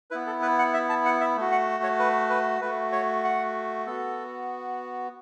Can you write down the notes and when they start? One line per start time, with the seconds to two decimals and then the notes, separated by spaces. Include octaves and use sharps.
0.11 B3 E4 B4
0.26 A4
0.42 B4
0.58 F#5
0.74 E5
0.89 A5
1.05 F#5
1.21 E5
1.36 A3 F#4
1.52 F#5
1.83 C#5
1.99 B4
2.30 B4
2.61 A3 F#4 B4
2.92 C#5
3.24 F#5
3.86 B3 F#4 A4